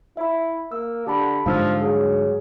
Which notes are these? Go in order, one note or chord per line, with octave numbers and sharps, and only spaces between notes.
E4 E5 B5
A#3 E6
D3 G4 A5 B5
G#2 D3 F3 G3 F5 E6
F#3 G#4